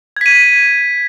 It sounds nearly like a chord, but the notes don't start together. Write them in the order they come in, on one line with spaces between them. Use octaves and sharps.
G#6 B6 D#7